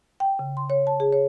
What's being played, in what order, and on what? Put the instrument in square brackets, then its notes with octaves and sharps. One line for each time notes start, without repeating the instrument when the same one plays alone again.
[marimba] G5
C#3
C6
C#5
A5
G#4
C#5